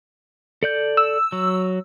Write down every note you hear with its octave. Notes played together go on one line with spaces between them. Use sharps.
A4 D5 G6
E6
F#3